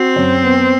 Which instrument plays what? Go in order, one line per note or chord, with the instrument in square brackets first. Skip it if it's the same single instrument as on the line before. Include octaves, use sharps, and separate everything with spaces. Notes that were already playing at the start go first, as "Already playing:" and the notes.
Already playing: [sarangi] C4 [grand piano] F#4
[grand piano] F#2
B3